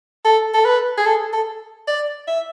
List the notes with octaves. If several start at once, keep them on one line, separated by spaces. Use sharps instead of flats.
A4
A4
B4
G#4
A4
A4
D5
E5